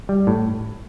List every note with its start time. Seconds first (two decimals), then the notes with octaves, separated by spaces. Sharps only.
0.09 G3
0.27 A2